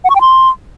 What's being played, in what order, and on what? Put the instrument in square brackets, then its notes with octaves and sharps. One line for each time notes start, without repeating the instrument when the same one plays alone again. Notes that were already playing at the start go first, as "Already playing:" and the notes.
[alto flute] F#5
C#6
G5
C6